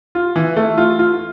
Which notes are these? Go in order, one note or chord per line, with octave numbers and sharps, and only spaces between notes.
F4
E3
A3
F4
F4